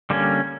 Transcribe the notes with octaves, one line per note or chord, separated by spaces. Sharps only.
D3 G3 A#3 C#4